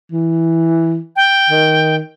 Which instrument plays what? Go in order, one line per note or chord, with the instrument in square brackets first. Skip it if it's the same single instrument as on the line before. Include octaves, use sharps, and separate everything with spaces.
[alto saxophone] E3
[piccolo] G5
[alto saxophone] D#3